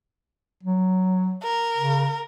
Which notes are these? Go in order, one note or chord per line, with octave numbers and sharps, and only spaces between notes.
F#3
A#4
C#3